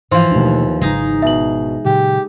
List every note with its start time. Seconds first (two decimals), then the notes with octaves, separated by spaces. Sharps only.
0.11 G#2 E3 F3 C5 C6
0.32 D#2 B2 A3 D4
0.81 G#1 C#3 F#3 G#3 D#4
1.22 B2 E5 F#7
1.85 A#2 C#3 F#3 G4